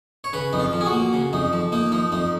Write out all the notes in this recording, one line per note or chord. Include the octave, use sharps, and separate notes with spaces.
C#5
C#3 B4
F2 D#4
F4
F3
G#4
F#4
A#3
C#3
F2 D#4
F3
A#3 D#4
F3 D#4
F2 D#4